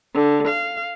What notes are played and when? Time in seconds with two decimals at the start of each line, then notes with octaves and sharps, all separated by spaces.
0.14 D3
0.48 F5